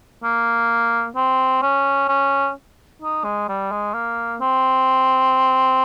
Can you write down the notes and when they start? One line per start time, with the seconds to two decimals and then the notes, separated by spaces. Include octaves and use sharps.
0.24 A#3
1.16 C4
1.62 C#4
2.08 C#4
3.02 D#4
3.24 G#3
3.49 G3
3.71 G#3
3.94 A#3
4.41 C4